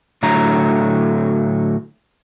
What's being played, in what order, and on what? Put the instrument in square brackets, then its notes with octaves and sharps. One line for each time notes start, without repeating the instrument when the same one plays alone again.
[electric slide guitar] A2 D3 F#3 A3 A#5